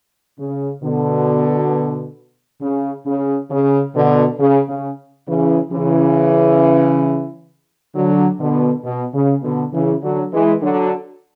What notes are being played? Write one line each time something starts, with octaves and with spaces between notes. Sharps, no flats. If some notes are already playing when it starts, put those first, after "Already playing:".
C#3
B2 D3
C#3
C#3
C#3
B2 D3
C#3
C#3
C#3 E3
C#3 E3
D3 F#3
B2 D3
B2
C#3
B2 D3
C#3 E3
D3 F#3
E3 G#3
D3 F#3